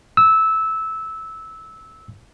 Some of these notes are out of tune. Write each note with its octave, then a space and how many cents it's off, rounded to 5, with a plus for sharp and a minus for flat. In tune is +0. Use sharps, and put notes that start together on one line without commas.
E6 -15